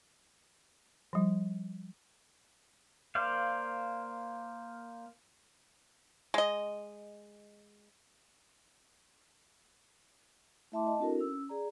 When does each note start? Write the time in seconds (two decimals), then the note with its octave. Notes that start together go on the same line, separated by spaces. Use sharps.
1.13 F3 G3
3.15 A#3 C5 D5 F5
6.34 G#3 D#5
10.72 A3 E4 E5 A5 C6 D6
10.86 D#5 A5
10.99 C4 D4 E4 F#4 A4 A#4
11.19 C#4 E6
11.49 G#4 D5 A#5